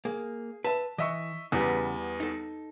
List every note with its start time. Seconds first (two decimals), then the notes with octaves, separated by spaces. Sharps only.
0.05 A#3 G#4
0.64 B4 E5 A5
0.98 E3 D#5 E5 C#6
1.52 E2 C#3 G3 B3
2.20 D#4 A4